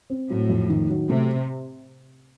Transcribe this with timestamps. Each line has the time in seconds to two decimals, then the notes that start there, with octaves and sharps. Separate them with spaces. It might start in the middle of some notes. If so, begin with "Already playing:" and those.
0.10 C4
0.30 A2 F#3
0.49 F2
0.70 D#3
0.89 F#3
1.10 C3 A3